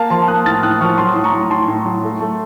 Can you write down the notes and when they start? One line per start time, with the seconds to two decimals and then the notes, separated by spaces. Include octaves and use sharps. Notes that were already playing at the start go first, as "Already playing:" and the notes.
Already playing: A#3 F5 A5
0.10 F3 A5 C6
0.28 A#3 D#6 F#6
0.46 A2 F6 A6
0.63 A2 D#6 F#6
0.81 F3 C#6 F6
0.98 F#3 C6 D#6
1.15 A2
1.24 A#5 C#6
1.33 A2
1.50 A2 A5 C6
1.68 A2
1.86 F#3
2.03 A3
2.20 A3